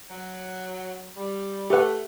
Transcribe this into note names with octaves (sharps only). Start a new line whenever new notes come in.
F#3
G3
A3 G4 B4 F#5